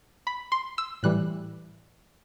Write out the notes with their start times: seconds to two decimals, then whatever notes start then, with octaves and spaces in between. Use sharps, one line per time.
0.27 B5
0.52 C6
0.78 E6
1.03 A2 E3 G3 F#6